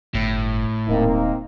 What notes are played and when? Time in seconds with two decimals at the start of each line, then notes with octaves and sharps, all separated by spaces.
0.14 G1 A2
0.88 D#1 A#3 C4 D#4